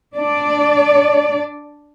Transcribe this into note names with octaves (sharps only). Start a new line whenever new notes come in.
D4 D5